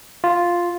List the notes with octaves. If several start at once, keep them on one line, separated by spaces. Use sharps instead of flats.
F4